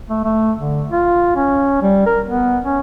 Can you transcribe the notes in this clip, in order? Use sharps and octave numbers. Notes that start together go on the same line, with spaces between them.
A3
A3
D3
F4
C#4
G3
A#4
B3
C#4